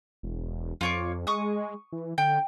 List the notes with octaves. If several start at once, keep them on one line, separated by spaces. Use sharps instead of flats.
E1
F2 F4 C#5 D6
G#3 C#6 D#6
E3
D3 G5